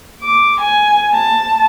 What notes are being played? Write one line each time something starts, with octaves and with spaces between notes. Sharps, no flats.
D6
G#5
A5